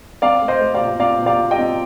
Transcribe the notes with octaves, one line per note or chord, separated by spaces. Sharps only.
C4 D5 F5
A3
C5 D#5
A3
D5 F5
A#2
C4 D5 F5
A#2
D5 F5
A#2
D#5 G5
C4